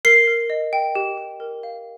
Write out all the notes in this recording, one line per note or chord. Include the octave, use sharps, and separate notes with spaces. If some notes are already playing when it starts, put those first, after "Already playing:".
A#4 C7
A#4
D#5
G5
G4
G4
A#4
F5